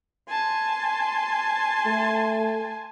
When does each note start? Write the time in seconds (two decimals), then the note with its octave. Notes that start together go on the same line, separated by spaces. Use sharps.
0.28 G#5 A5 C6
1.86 A3